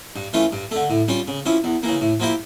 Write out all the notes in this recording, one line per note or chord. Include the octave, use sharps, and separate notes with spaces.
G2
E3 A3 C#4 F4
G2
D3 A3
A2
G3 C#4 F4
C#3
F3 C#4 E4
E2
C#3 E3 A#3
A2
F3 A#3 E4 G4